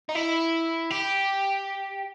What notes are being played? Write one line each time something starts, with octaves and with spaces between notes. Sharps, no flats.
D#4
E4
G4